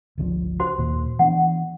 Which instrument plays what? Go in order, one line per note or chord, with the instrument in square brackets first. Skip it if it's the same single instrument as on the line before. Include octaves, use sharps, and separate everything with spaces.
[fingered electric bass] G1 C#2 F3
[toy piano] F#4 C5 C6
[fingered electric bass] D#2 A#2
[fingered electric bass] E3 B3 D4 [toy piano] F#5